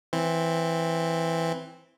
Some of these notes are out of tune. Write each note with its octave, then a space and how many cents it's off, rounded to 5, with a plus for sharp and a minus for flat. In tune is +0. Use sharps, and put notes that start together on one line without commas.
E3 +0 C4 +0